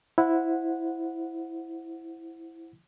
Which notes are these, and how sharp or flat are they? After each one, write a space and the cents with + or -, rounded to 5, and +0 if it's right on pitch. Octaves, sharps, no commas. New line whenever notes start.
E4 +0 C5 +5 F#5 -10